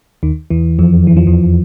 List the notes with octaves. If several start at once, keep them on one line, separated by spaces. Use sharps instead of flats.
D#2 D#3
E2 E3
F2 F3
E3
F3
E2 E3